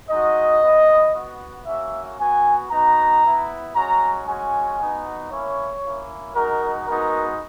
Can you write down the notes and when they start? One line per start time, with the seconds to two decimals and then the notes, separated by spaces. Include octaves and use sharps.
0.10 G#3 D#4 F#4 D#5
0.62 B3 E4
1.14 B3 F#4
1.66 A#3 C#4 F#4 E5
2.19 B3 F#4 G#5
2.71 B3 D#4 F#4 A#5
3.23 B3 E4
3.75 G#3 C#4 F#4 A#5
4.27 G#3 C#4 F#4 G#5
4.80 B3 D#4 F#4
5.32 A#3 C#4 E4 C#5
5.84 A#3 C#4 E4
6.35 G#3 D#4 F#4 A#4
6.88 G#3 B3 D#4 F#4 A#4